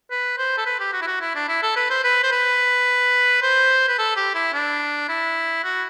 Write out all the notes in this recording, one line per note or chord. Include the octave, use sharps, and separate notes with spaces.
B4
C5
A4
B4
G4
F#4
E4
F#4
E4
D4
E4
A4
B4
C5
B4
C5
B4
C5
B4
A4
G4
E4
D4
E4
F#4